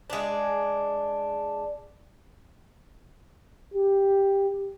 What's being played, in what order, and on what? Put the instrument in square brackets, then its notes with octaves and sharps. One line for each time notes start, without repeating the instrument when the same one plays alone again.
[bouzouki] G#3 D4
[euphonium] G4